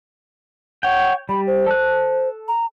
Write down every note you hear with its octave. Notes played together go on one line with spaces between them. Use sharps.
C#5 F#5 G5
G3 B5
C5
A4 F#6
A#5